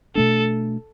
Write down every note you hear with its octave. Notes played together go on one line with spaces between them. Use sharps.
B2 A3 D4 A4